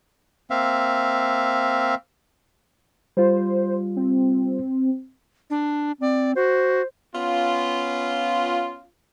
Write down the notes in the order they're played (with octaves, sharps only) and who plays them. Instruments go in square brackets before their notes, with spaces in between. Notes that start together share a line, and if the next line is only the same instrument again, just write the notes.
[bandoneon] A#3 C4 E5 F5
[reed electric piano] G3 F4 [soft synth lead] C5
[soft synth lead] C4
[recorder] D4
[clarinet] C4 [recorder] D5
[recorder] F#4 [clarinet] C5
[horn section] B3 C#4 F4